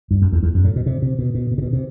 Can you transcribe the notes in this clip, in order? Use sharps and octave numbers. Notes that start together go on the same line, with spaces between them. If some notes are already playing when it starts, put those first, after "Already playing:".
G2
F#2
E2
E2
F#2
A2
B2
C3
C3
B2
B2
B2
C3
B2
C3